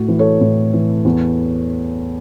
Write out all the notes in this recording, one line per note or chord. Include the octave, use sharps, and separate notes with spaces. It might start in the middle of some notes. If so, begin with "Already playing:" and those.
Already playing: A2 F#4
E3
A4 C#5
A2
E3
E2